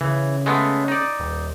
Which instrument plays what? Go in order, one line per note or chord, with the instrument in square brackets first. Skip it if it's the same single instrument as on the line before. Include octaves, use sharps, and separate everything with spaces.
[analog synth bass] C#3 [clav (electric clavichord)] E3
[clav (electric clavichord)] G#3 A3 B3
D#4 D5
[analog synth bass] D#1